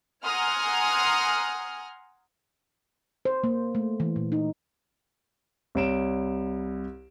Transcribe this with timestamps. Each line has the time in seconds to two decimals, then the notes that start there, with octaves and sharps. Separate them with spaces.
0.24 F#5 G#5 A#5 C6 D#6 F6
3.25 C5
3.44 A#3
3.75 A3
4.00 E3
4.16 A#2
4.32 D#4
5.75 C2 C#5 D7 E7